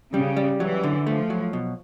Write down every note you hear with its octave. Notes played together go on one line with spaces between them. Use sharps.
C#3 G3
G3
E3 F#3
D3
F3 A3
F#3
B2